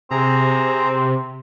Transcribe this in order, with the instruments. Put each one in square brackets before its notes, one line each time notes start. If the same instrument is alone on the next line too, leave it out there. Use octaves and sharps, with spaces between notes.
[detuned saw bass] C3 [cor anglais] C4 [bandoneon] G#4 A#5